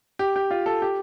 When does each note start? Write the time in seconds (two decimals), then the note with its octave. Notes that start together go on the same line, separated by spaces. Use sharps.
0.19 G4
0.36 G4
0.51 F4
0.66 A4
0.82 G4